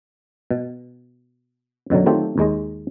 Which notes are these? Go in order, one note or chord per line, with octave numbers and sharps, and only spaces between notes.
B2
F#2 B2 D3 F#3
D#3 F#3 A3 C4 F4 G4
D#2 G#3 D#5